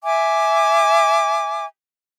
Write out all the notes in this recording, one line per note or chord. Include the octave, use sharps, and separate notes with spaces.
E5 G#5 D6